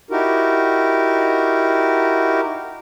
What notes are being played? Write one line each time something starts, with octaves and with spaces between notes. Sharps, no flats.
D#4 E4 F#4 G4 A#4